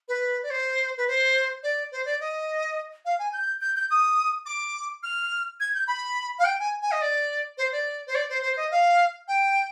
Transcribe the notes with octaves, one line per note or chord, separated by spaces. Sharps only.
B4
D5
C5
B4
C5
D5
C5
D5
D#5
F5
G#5
G6
G6
G6
D#6
D6
F6
G#6
G6
B5
F5
G5
G#5
G#5
D#5
D5
C5
D5
C5
D5
C5
C5
D#5
F5
G5